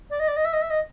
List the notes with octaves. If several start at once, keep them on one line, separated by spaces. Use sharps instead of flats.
D5
D#5
D5
D#5
E5
D#5
E5
D#5